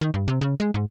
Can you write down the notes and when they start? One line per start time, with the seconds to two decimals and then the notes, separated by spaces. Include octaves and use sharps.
0.01 D#3
0.14 G2
0.28 C3
0.41 C#3
0.60 G#3
0.74 G#2